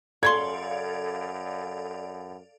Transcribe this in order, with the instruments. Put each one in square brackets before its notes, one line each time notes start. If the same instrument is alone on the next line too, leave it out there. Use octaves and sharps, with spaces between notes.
[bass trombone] F#2 [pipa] C#3 B5 C6 [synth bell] A4 D5 F5 [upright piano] G#6